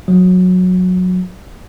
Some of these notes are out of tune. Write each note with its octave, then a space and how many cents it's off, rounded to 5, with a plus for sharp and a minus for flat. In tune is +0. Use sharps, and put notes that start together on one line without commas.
F#3 -20